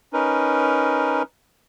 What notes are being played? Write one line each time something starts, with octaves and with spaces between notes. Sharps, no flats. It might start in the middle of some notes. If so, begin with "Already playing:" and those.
C#4 D#4 A#4 B4